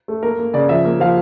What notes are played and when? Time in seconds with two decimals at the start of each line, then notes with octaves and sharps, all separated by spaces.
0.08 A3
0.23 A#3 A#4
0.39 A#3
0.54 C#3 D5
0.69 F3 E5
0.85 A#3
1.00 F3 F5